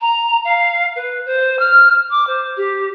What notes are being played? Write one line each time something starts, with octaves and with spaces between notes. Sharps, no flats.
A#5
F5
B4
C5
F6
D6
C5
G4